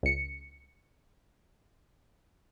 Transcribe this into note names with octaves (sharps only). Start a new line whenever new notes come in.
C#2 C#7